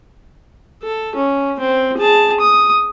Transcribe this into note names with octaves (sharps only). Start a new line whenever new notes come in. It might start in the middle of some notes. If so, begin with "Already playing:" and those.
A4
C#4
C4
G#4 A5
D#6